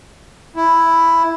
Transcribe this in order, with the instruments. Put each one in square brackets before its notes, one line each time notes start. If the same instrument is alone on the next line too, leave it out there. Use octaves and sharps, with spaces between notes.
[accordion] E4